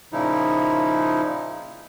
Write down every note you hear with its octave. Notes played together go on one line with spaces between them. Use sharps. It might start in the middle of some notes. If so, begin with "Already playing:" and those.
A#2 C#3 F3 D#4 E4